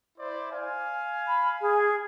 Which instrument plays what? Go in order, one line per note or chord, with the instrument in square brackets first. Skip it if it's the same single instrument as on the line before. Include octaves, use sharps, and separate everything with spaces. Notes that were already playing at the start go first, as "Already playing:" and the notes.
[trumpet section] E4 C5 D5
F5 G#5
[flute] B5
G#4